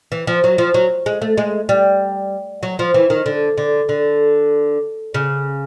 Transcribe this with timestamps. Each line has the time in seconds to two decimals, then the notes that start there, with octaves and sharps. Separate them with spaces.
0.12 E3
0.27 F3
0.44 F#3
0.58 F3
0.74 F#3
1.06 G#3
1.22 A3
1.37 G#3
1.69 G3
2.63 F#3
2.79 F3
2.94 E3
3.10 D#3
3.26 D3
3.58 D3
3.89 D3
5.14 C#3